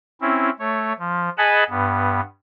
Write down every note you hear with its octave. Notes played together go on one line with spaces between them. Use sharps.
C4 C#4 E4
A3 C#5
F3
G#4 D#5 F#5 G#5 A5 B5
G2 B3